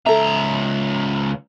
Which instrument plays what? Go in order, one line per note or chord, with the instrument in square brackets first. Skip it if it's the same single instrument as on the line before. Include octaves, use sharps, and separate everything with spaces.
[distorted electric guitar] C#2 A#5 [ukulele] A4 E5